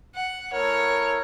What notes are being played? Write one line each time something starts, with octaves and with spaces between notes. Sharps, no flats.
F#5
A3 E4 A#4 C#5